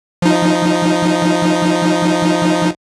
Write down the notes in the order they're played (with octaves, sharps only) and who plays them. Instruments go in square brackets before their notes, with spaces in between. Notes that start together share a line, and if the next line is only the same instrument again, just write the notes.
[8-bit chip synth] F3 D#4